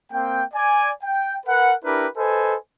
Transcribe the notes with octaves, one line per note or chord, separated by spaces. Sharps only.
A#3 C4 G5
D5 G#5
G5
A#4 B4 F#5
D4 E4 G4 A#4 B4
A4 B4 C5 D#5 G#5